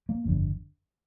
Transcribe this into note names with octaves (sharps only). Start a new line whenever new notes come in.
A#3
G1 F2 D3